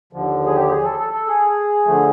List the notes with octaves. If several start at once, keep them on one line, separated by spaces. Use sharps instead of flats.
D#2 D3 F3
G#4
G4
G#4
A4
A4
A4
G#4
D3 F3 A3